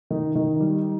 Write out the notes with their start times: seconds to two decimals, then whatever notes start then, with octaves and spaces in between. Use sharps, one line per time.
0.10 D#3 D#4
0.35 D#3
0.60 G3